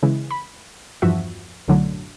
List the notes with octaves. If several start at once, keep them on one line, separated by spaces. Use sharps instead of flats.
C#3 E3 G#3
B5
E2 G2 F3 F#4 E5
B1 F#2 A2 D3 F#3